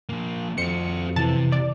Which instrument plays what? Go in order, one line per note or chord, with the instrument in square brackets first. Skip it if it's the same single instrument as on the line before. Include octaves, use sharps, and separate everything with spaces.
[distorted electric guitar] F3 A#3
[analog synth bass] F2 [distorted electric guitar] F#4 C5 [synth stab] C#7
[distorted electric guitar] C3 [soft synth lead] E3 [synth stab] A5
[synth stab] D5